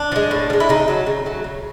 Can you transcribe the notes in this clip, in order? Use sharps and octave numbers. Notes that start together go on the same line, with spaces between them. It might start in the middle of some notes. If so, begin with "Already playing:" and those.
Already playing: D4
F3
G#3
A2
F3
G#3
E4
C#3 D#4
F#3 A3
C#3
F#3 A3
C#3